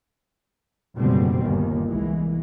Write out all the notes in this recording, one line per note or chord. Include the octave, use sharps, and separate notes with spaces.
F#1 G#2 B2 D3 G3 C4
G1 D#2 D#3
C2 E3 G#3